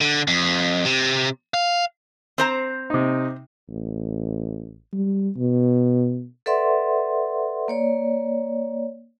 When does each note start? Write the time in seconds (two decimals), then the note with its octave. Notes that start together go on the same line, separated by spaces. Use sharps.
0.01 D3
0.27 F2
0.85 C3
1.54 F5
2.38 C4 C5 A#5
2.90 C3 D#4
3.69 A1
4.93 G3
5.37 B2
6.46 A4 B4 D5 E5 F#5 C6
7.68 A#3 C#5 D5